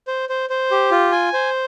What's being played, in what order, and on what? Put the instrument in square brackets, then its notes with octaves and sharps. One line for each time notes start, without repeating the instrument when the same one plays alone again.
[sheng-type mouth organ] C5
C5
C5
G4
F4
G#5
C5